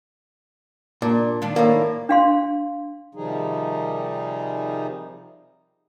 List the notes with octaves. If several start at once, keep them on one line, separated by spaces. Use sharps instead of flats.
A#2 D4
D#3 D4 F4
A2 A#3
D4 F5 C6
C3 D#3 F3 G3 D#4 G#4